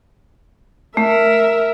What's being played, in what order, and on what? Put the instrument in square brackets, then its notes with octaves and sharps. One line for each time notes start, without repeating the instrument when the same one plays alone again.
[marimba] A3 [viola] A#4 E5